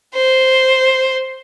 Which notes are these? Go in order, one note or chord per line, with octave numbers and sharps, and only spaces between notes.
C5